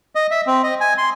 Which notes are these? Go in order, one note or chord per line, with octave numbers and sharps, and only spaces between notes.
D#5
E5
C4
D#5
G#5
C6